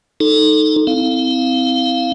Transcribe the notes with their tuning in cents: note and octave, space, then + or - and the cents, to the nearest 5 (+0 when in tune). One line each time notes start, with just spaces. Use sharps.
D#4 +0 A4 +0
C4 -20 E4 -35 F5 +0